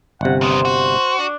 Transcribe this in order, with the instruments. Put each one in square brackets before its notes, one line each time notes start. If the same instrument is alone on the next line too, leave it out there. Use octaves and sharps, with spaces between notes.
[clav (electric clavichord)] G1 C3 [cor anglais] F#5
[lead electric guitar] D#2 B3 [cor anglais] C5
[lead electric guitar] F#4
[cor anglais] D4